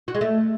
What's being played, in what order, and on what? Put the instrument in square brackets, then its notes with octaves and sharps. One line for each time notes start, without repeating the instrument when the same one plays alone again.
[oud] F#4
G#3
A3